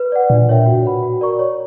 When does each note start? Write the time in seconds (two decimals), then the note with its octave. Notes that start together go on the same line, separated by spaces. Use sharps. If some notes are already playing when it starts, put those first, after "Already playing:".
Already playing: B4
0.12 D5 F#5
0.29 A#2 D4
0.48 A#4 C#5 E5 G5
0.66 F#4
0.84 B4 F#5 B5
1.03 F#4
1.21 A#4 D5 A#5 C#6
1.39 C#5